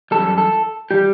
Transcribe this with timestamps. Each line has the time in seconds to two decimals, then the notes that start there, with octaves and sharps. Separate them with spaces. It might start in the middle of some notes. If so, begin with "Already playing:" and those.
0.11 F#2 E3 G3 A4
0.38 A4
0.91 E3 G3 G4